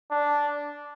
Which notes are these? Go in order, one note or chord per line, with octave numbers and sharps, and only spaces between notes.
D4